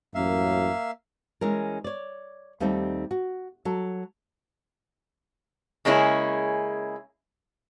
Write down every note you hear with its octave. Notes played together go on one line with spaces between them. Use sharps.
A1 F#2 A#3 E5 F5
E3 G#3 C#4 A#4
C#5 D5
D#2 G3 A3 C4 D#4
F#4
F#3 A4
C#3 G#3 A#3 C#4 D#4 E4